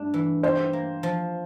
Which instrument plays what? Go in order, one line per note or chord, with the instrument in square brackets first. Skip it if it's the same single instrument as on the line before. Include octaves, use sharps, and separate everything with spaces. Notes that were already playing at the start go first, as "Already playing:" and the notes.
Already playing: [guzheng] G2 A3 D4
E3
[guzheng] G4 [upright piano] C5
[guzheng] A#3
F3